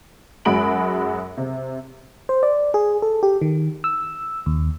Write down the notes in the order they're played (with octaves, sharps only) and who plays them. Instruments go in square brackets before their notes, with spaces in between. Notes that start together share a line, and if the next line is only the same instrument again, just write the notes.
[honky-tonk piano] F#2 G#3 F#4 B5 D7 F#7
C3
[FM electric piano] C5
D5
G#4
A4
G4
D#3
E6
D#2